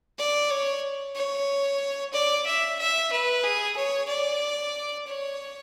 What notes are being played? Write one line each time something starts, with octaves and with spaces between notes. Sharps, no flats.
D5
C#5
C#5
D5
E5
E5
B4
G#4
C#5
D5
C#5